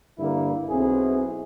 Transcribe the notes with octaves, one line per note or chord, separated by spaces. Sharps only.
G2 D3 A#3 E4
B1 C4 E4 G#4